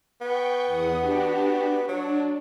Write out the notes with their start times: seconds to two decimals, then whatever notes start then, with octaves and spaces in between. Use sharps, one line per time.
0.21 B3 G5 C#6 G6
0.67 E2 F#5 D#6
1.00 D4 F#4 G4
1.88 F#3 D4